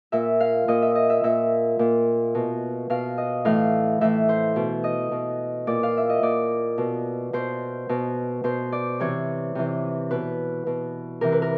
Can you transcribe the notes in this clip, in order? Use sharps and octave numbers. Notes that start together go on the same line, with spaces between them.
A#2 E5
F5
A#2 D#5
E5
D#5
E5
A#2 E5
A#2
B2
B2 F5
D#5
A2 E3 F5
A2 E3 E5
C5
B2
D#5
B2
A#2 D5
F5
E5
D#5
A#2 D5
B2
B2 C5
B2
B2 C5
D5
C3 E3 C#5
C3 E3
B2 B4
B2
C3 E3 A#4
B4
A#4